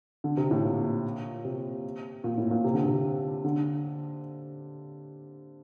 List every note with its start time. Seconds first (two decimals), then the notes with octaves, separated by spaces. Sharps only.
0.24 D3
0.37 C3
0.51 A2
0.65 A#2
1.45 C3
2.24 A#2
2.38 A2
2.51 A#2
2.64 C3
2.74 D3
2.85 C3
3.44 D3